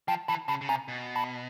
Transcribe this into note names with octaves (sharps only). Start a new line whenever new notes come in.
F3 G5 A5
E3 A5 B5
C#3 A5 B5
C#3
C3 G#5 A#5
B2
A5 B5